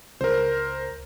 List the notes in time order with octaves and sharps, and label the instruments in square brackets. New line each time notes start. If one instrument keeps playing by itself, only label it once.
[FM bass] C#2 [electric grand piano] A#4 C5